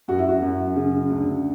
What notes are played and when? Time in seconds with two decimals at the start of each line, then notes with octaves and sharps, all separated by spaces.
0.08 F#2 F#4
0.19 E4
0.28 F#4
0.42 F#2
0.76 C#3
1.10 D2